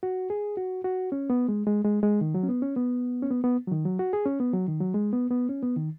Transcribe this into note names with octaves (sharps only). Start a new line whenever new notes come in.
F#4
G#4
F#4
F#4
C#4
B3
G#3
G#3
G#3
G#3
D#3
F#3
C#4
B3
C#4
B3
C#4
B3
B3
F#3
D#3
F#3
F#4
G#4
C#4
B3
F#3
D#3
F#3
G#3
B3
B3
C#4
B3
D#3